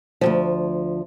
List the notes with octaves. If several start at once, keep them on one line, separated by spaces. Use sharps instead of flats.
D2 G2 F3